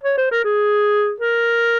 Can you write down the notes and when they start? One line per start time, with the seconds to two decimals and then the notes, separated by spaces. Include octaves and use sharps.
0.04 C#5
0.17 C5
0.31 A#4
0.44 G#4
1.20 A#4